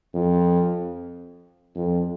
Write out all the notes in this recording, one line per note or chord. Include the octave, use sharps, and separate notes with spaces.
F2
F2